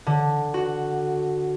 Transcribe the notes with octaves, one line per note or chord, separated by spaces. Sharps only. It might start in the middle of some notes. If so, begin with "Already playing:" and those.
D3
F#4